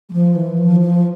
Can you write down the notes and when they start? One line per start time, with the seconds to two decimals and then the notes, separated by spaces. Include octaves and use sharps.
0.10 G3
0.13 F3
0.35 E3
0.58 F3
0.80 F3